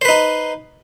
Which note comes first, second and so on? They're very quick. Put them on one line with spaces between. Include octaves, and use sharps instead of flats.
C5 B4 D#4